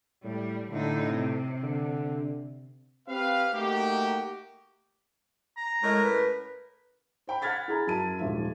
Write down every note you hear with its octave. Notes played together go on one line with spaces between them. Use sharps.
A2 G3
A2 D3 D#4
C3
D3
C4 G4 B4 F5
A3 A#3 D#4 F#4 G4
A#5
A2 G#3 C#4 A#4
B4
C5 G5 B5
F#5 B5 F6 G#6 A6 B6
E4 G#4 A#5 B5
F#2 A5 D#7
D#1 G#2 F3 E5